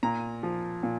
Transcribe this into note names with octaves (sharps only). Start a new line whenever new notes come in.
A#2 A#5
F3
A#2